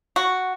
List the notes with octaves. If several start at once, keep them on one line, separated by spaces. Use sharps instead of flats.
F#4